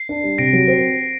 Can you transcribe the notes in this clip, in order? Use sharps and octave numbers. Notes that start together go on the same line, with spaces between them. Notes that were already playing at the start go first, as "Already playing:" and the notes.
Already playing: C7
D4
G3
C3 A#6 D7
F#3
C4